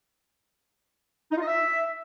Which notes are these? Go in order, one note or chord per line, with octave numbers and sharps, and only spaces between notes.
D#4
F4
D#5
E5